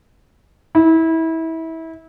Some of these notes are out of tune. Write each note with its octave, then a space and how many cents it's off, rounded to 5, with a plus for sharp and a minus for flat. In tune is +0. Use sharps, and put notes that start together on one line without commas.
E4 -25